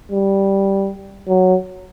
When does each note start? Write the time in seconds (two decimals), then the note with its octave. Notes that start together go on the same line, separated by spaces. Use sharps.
0.12 G3
1.28 F#3